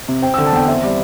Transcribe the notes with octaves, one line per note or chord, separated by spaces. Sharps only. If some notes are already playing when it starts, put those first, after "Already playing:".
C3
C4 G5
D3 E6
A5
E2 G5
C4 E5
G3